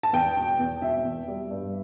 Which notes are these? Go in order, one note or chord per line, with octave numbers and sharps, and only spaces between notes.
A5
E2 G5
B2
E2
B2 E5
E2
G3
G2